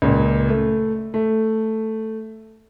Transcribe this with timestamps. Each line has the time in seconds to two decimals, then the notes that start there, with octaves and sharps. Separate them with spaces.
0.02 C#2 A#2
0.49 A3
1.14 A3